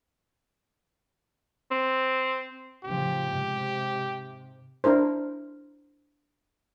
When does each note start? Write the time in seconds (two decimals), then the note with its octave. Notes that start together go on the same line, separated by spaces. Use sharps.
1.71 C4
2.84 A2 C#3 F3 G4
3.26 G#2 C3
4.84 D4 E4 A#4 C5